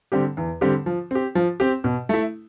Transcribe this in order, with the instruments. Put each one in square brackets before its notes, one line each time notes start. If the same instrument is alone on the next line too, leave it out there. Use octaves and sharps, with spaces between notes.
[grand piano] D3 G3 C4 G4
E2
D3 G3 C4 G4
F3
C4 G4
F3
C4 G4
B2
A3 E4